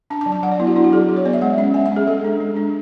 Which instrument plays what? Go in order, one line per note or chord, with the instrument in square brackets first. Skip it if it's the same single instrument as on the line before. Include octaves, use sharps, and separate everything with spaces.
[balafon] D4 A5
A5
F#3
A5
F#3 F#5
D5
B3 E4
F#4
D4 E4
F#4
F#3 G#4
F#3 G#4
C#5
B3 D5
E5
G#3 F#5
C#4 E5
G#3 G#5
E5
C#4
G#4
G#3 A4
D4
G#3
D4